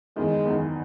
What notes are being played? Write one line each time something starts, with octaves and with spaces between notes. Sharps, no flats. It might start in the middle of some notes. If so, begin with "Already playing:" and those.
F#1 E2 D#3 G#3
F#1 E2 D#3